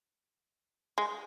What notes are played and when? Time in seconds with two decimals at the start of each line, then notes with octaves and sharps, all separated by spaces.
0.98 G#3